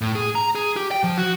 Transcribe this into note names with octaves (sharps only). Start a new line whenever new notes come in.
A2
G#4
A#5
G#4
G4
G5
F3
F#4